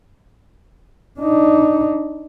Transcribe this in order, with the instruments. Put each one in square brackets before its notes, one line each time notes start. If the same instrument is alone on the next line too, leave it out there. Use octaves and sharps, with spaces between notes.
[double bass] D4 D#4